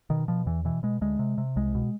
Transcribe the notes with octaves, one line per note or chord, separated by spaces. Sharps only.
B2 D#3
B2 F3
E2 E3
B2 E3
B2 G#3
D2 G#3
C3
C3
C2 G#3
B2